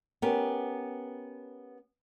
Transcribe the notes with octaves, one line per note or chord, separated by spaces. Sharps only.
B3 C#4 G4 A#4